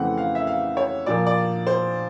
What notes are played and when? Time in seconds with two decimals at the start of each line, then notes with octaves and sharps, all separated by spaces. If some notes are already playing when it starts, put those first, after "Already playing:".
Already playing: F2 C#3 E3 A3 C4 F#5
0.18 F5
0.35 E5
0.47 F5
0.77 C#5
1.06 A#2 F3 A#3 D5
1.27 D5
1.67 C5